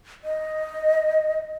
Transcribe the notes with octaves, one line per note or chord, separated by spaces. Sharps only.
D#5